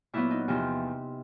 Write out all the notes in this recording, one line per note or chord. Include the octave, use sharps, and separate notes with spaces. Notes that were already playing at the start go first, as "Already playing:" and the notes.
A#2 F#3 B3 E4
D#4
E2 C3 F3 D#4